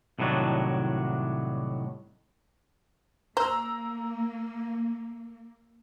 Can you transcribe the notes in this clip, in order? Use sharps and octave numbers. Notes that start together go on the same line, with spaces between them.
C2 A2 D#3 F#3 D4
A#3 C5 A#5 E6